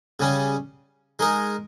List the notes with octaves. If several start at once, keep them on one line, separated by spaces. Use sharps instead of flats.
C#3 G3 C#4
G#3 D#4 A#4